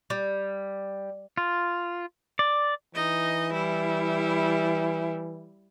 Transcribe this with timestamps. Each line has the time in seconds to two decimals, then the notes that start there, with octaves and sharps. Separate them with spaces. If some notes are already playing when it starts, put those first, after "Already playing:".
0.10 G3
1.38 F4
2.39 D5
2.95 E3 D#4 D#5
3.53 G3 E4